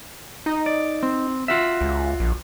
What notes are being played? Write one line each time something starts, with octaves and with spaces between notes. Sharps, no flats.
D#4
D5
C4
F4 F#4 E5
C#2
A#1